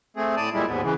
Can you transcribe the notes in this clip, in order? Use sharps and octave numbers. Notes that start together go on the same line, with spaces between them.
A3 C4 G#4
A2 D5 A5 D#6
A#2 G3 G#3 E4
D#2 G#2 B3
C#3 E3